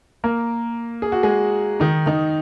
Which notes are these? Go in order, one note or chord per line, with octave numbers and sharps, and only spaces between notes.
A#3 A#4
G#4
F#4
G#3 G#4
D#3 D#4
D#3 D#4